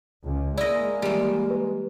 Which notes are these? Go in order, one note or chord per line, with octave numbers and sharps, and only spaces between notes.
C#2
G#3 A#3 E4 D5 D#5
E3 G3
B4